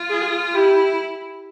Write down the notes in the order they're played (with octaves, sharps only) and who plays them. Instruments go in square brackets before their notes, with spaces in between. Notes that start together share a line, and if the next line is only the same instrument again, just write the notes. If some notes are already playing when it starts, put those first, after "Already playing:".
Already playing: [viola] F4
[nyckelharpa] G#4
[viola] E4 [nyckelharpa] G4